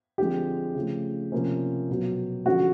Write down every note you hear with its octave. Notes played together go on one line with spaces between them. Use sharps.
D3 F3 G#3 C4 G4
C#3 F3 A3
C3 F3 A#3 C#4
B2 F#3 B3
D3 F3 G#3 C#4 F#4